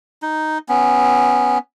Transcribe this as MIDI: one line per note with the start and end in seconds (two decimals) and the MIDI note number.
0.22 0.58 63
0.69 1.58 59
0.69 1.58 61